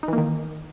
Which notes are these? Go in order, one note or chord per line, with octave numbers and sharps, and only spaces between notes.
D#3 E3 A#3 D#4